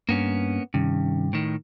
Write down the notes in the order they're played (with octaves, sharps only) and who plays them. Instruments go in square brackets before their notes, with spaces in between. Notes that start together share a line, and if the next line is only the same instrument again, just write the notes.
[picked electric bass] G2 [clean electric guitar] A#3 B3 C#4
[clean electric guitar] G2 [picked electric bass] C3 D#3 C#4
[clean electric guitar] A2 D#3